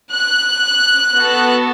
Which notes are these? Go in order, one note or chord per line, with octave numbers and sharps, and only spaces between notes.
F#6
B3 F#4 A4